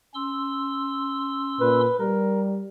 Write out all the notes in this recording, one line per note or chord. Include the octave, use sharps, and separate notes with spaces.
C#4 C6 E6
A#2 B4
G3 A#4